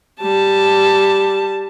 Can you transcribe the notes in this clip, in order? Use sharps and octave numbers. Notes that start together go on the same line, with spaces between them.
G3 A5